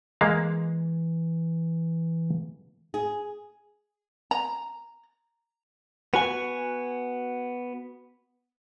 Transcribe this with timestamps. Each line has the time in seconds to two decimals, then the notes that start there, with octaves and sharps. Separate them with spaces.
0.21 E3 G#3 A#3 F5
2.94 G#4
4.31 A#5
6.14 B3 F#4 G#5